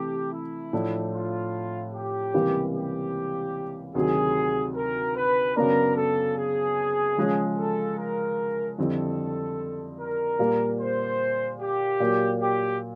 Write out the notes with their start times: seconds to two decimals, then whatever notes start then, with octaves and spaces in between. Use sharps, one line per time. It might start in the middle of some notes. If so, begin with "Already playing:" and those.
Already playing: C3 E3 A3 G4
0.32 E4
0.73 A2 F3 A3 D4
1.13 F4
1.93 G4
2.34 C#2 C3 E3 G3 A#3
2.74 G4
3.95 D2 C3 D#3 F#3 G#4
4.75 A#4
5.16 B4
5.56 F#2 C#3 F#3 B3 D4 A#4
5.96 A4
6.37 G#4
7.17 C#3 F3 G#3 C#4
7.58 A4
7.98 A#4
8.78 F2 D3 G3 C4 E4 A4
9.99 A#4
10.39 A#2 G3 A#3
10.80 C5
11.61 G4
12.00 A#2 F#3 A#3
12.41 G4